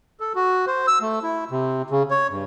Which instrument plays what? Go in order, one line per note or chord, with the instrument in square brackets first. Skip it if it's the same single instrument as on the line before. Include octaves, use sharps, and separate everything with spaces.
[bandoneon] A4
F#4
C5
E6
A3
E4
C3
C#3
C#5
G2